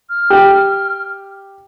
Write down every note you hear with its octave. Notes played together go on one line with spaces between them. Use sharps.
F6
G4